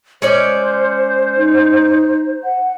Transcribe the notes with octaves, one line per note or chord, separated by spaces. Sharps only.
G#3 C#4 C5 D5
D#4
F#5